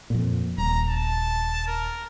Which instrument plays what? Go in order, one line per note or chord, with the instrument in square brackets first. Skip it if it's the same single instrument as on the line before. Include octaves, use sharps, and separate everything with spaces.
[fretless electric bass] F2 A#2
[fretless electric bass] D#1 [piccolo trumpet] A#5
[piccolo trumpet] A5
A#4